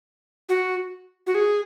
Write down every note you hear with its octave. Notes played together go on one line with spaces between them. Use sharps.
F#4
F#4
G#4